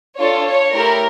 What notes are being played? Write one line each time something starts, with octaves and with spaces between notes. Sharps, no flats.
D4 F4 A4 C#5
C#5
A3 E4 G4 A#4